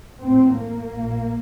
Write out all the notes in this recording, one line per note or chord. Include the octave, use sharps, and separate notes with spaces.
A1 A2 C4
A#3
A#1 A#2